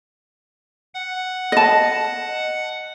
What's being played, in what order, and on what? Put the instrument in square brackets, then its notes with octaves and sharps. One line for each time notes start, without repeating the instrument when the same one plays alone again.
[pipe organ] F#5
[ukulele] D#5 A5